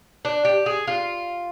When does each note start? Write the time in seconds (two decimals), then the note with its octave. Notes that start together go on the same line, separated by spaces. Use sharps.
0.25 D4
0.45 G4
0.66 G#4
0.87 F4